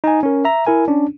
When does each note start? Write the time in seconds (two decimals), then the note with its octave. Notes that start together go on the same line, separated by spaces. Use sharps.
0.04 D#4 G#5
0.23 C#4 A#4
0.45 E5 A#5
0.67 E4 A#4 G#5
0.88 C#4 D4